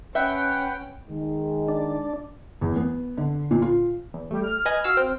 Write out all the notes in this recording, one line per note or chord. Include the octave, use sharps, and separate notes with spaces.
C#4 B4 E5 F#5 G5
D#3 G#3
D4
E2
B3
D3
A#2
F4
E2
G3 A3 G4
F6
B4 D#5 G#5
F#4 F5 E6
C4 C5 G5